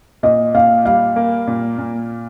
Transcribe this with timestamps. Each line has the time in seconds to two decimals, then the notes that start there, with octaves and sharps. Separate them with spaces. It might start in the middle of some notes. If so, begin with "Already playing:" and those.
0.23 A#2 D#5
0.54 A#2 F5
0.85 G3 F5
1.16 A#3
1.47 A#2
1.78 A#2